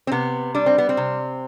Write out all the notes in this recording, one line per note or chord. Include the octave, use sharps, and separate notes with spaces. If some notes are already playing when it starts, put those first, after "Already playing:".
C4
C3 B3
G3 D4
C4
B3
C4
C3